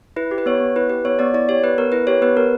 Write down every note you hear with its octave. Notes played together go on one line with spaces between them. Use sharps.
E4 B4
G4
B4
B3 C#5
B3
E4 B4
G4 B4
B3 C#5
B3 D5
E4 D5
G4 C#5
B3 B4
B3 A#4
E4 B4
G4 C#5
B3 B4
B3 A#4